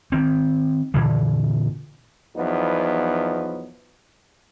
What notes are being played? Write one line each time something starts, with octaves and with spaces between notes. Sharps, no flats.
D#3 C4
A#2 D3 E3
E2 F3 F#3 B3 D#4